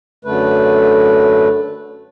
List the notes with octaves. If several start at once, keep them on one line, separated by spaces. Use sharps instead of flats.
F#2 D3 A3 B4